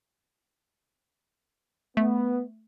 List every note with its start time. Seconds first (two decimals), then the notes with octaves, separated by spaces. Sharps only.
1.97 A3 B3